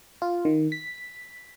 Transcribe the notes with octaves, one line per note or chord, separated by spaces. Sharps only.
F4
D#3
B6